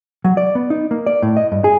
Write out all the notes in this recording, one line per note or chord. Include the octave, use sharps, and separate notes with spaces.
F#3
D5
B3
D#4
A#3
D5
A2
D#5
G2
G#4